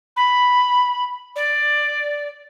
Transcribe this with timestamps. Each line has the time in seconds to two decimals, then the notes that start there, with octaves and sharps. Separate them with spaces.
0.16 B5
1.35 D5